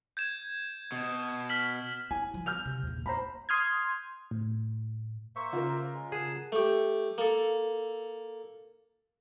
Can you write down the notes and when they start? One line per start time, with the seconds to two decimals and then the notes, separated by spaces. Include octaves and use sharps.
0.17 G6 G#6 E7
0.92 B2
1.49 F6 B6 F#7
2.11 E4 G#5
2.34 F3 G3
2.46 F6 G6 F7
2.65 C3
2.83 A#1 E2
3.06 A#3 C5 A#5 B5
3.49 C6 D#6 F6 G6 G#6
4.31 A2
5.36 A#3 C5 E5 C#6
5.53 C#3 F4 A#4
5.95 G#3
6.12 G#4 F#5 A5
6.52 A3 G4
7.18 A#3 A4